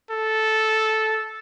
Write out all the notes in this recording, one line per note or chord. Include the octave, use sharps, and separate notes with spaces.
A4